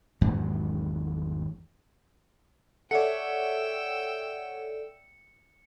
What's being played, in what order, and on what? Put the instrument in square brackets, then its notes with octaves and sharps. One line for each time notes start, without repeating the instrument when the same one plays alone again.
[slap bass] G#1 E2 G#2 F#3
[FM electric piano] A4 D5 [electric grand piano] C#5 E5 F#5 [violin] G5 E6 [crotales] C#7